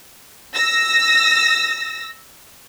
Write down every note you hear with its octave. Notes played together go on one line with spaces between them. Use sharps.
E6 A#6